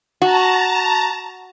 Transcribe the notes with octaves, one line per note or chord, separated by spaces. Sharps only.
F#4 A5 A#5